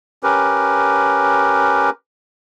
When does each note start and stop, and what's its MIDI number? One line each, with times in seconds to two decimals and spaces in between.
0.23 1.90 61
0.23 1.90 67
0.23 1.90 70
0.23 1.90 71